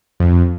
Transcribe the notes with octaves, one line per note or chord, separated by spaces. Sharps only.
F2